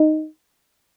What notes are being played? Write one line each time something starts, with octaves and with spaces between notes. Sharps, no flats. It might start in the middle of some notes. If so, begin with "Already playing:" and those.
Already playing: D#4